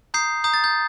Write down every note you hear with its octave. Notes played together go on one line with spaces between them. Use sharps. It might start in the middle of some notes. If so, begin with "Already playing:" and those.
A#5 D#6 G6 C7
A#5 D#6 G6
A6
G6